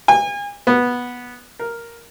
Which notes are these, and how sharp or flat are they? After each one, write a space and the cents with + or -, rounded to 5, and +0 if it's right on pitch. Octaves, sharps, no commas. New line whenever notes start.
G#5 -35
B3 -10
A#4 +0